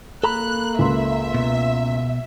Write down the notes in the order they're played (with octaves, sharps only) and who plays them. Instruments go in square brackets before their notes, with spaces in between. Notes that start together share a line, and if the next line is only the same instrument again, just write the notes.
[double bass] A#3 [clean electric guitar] A4 A#5 B5 [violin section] F#6
[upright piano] C#2 C6 [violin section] E5
[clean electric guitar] B2